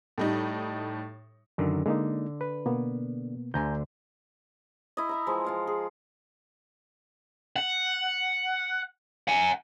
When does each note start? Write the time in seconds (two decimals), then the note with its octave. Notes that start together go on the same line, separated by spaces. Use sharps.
0.18 A2 G3 D#4
1.58 F#2 D3 D#3
1.86 D3 G#3 A#3 D#4
2.41 B4
2.66 B2 A#3 B3
3.54 D2 D3 G#5 A#5 G6
4.97 E4 D#5
5.09 E4 E5 A#5
5.27 E3 F3 G#3
5.45 F3 F5 A#5
5.67 G#4
7.56 F#5
9.28 F#5 G#5